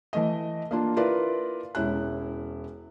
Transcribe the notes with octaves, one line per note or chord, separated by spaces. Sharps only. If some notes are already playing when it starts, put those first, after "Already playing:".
E3 A3 D#5
A#3 D4 F4
E4 F4 A#4 B4 D5
E1 C#4 E4 F#6